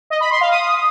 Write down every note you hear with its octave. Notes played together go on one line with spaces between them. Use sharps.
D#5
B5
C6
F5
D#6